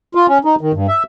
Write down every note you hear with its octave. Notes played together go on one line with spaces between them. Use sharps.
F4
C#4
D#4
D#3
G2
E5